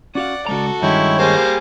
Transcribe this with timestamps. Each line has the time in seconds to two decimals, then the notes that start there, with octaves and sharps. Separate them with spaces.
0.15 C#4 F#4 D5 F5 F#5
0.47 C#3 G#3 F#4 A4 A#5
0.82 G2 D#3 G#3 C#4 E4 C#5 G5
1.19 G3 A#3 G#4 C5